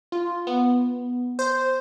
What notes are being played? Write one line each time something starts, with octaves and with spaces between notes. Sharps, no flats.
F4
B3
C5